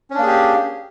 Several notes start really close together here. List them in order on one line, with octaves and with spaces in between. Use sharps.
C#4 D4 A#3 G#4 G4